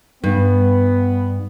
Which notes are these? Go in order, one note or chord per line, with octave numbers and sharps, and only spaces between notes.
G2 B3